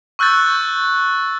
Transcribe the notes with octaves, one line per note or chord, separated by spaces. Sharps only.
C#6 E6 F#6 G6 A6